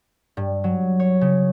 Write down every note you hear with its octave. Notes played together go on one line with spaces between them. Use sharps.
G2
F#3
C#5
C#3